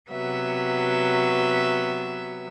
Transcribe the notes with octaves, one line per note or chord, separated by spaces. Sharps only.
C3 F#3 B3 E5